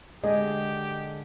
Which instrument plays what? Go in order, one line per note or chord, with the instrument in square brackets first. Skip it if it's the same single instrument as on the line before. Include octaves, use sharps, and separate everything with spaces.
[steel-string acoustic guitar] D3 G#4 [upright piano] G#3 [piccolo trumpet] G4 [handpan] D#5